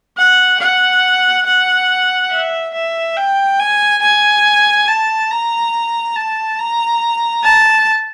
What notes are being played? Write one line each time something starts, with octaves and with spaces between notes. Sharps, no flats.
F#5
F#5
F#5
E5
E5
G5
G#5
G#5
A5
A#5
A5
A#5
A5